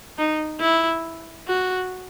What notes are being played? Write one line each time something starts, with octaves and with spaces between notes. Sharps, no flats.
D#4
E4
F#4